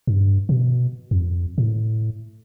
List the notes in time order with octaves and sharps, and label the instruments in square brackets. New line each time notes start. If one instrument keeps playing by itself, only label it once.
[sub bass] G2
B2
F2
A2